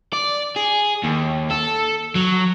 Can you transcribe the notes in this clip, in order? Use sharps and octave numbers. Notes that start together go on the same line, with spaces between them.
D5
G#4
D#2
A4
F#3